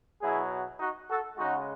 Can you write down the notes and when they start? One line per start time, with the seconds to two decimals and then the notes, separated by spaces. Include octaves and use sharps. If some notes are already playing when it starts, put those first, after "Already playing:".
0.21 B2 F#3 E4 G#4
0.79 D#4 F#4
1.09 F#4 A4
1.37 C#3 G#3 D#4 F#4